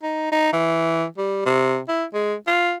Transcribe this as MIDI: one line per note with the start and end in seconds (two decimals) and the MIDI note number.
0.03 0.30 63
0.32 0.51 63
0.53 1.05 52
1.18 1.41 55
1.46 1.80 48
1.89 2.05 64
2.14 2.34 56
2.47 2.74 65